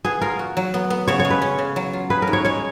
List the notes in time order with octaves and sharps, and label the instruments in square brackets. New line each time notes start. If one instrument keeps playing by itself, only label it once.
[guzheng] B3 [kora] G#4
[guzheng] F4 [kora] A#4
[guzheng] F#4
F#3
B3
B3
[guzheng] C#3 [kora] C#5
[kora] C#5
[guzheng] G#3
[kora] B4
[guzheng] C#4
C#3
F#3
F4
[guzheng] G#4 [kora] B4
[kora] A#4
[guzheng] G#2
[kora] C#5
[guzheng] G#3 [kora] C#5